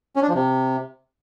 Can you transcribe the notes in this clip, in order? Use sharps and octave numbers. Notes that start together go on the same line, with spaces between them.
C#4
D4
F3
C3